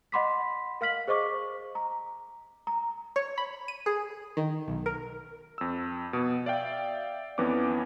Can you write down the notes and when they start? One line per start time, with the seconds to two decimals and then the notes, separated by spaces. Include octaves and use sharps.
0.12 D#5 F#5 B5 C6 D6 B6
0.81 A#4 F5 F6 B6 F#7
1.07 G#4 C5 D#5 C#6 D6
1.75 A#5
2.67 A#5
3.16 C#5
3.38 B5
3.68 D#7
3.86 G#4
4.37 D#3
4.68 B1
4.86 A#4
5.58 F2 E6
6.13 B2 B3
6.46 D5 E5 F5 G5
7.38 F2 E3 B3 C#4 D6